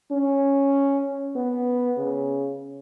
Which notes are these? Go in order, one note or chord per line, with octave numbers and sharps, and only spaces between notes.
C#4
B3
C#3